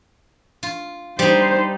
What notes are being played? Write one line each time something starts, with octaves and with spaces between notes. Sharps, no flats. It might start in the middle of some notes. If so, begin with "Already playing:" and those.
F4
G3 D#4 C5